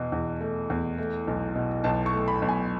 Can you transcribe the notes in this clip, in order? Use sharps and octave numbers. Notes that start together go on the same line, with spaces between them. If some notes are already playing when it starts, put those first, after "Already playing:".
Already playing: E2 B2
E2
A3
E2
A3
B1
B2
B1 A5
C#6
A3
B5
B1
G#5